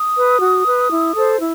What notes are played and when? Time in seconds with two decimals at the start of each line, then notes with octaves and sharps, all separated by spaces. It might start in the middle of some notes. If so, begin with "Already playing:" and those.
Already playing: D#6
0.17 B4
0.42 F#4
0.66 B4
0.91 E4
1.15 A4 C5
1.39 E4